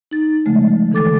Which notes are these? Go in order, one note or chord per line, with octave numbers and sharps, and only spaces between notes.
D#4 A6
C#3 F3 G#3 A3
D3 E3 A4 D6 A6